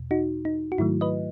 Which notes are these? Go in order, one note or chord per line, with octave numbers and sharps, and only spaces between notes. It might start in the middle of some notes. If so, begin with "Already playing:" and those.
Already playing: E2 B2
D#4 F#4
D#4
F#4
G#2 D#3 F#3 A3 E4
B4 D#5